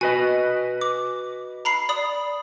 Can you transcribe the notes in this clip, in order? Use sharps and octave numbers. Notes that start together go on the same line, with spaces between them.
F#4 B4 D#5 G#5
D6
A#5 B5 C7
D5 B5 D#6